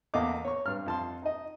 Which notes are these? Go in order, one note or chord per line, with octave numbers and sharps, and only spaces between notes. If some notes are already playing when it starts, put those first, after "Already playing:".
E2 A#3 A4 D#5 F5 D6
C#5 C#6
G2 F6
F2 A5 C6
D#4 D#5